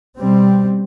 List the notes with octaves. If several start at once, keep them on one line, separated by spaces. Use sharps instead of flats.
B2 G3 C4